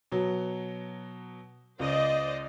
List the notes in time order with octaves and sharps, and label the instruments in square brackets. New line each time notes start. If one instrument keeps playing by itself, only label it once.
[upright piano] B2 F#3
[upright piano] C#2 [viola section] C5 D5 D#5